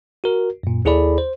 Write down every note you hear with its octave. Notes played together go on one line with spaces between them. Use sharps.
F#4 A#4
F#2 A#2
D#2 E4 G#4 A4 D5 B5
C5